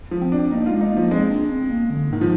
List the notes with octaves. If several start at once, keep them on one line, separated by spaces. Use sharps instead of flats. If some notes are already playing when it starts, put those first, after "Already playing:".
F3
C4
D4
A#3 D#4
G#3 F4
D#4
A#3
F3
G#3 C4
D4
C4
A#3
D3
G#2 D#3
F3